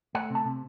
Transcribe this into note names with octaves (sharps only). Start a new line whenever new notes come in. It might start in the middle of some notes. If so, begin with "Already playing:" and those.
A3 F#5
C3 A5
C3